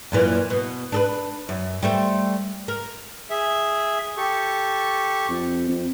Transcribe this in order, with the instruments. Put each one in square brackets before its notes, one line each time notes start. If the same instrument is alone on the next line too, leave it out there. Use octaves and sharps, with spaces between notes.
[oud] F#2 A#2 E3
B2
D4 A4 B4
F#2
G3 A3 C5
A#4
[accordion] G#4 E5
G4 A4 C#6
[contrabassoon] F2
F2